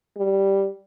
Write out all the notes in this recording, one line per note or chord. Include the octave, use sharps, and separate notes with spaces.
G3